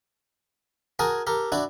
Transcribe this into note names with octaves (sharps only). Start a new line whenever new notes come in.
F#4 G#4 A#4 G#5 A5
G4 A4 A#4
D4 E4 F#4 D5